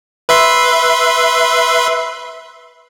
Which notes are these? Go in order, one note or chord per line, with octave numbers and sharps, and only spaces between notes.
B4 E5 C6